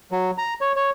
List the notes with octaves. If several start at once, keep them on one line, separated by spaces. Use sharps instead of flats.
F#3
A#5
C#5
C#5